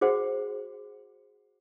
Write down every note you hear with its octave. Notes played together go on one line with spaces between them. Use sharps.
F#4 G#4 C5 F#5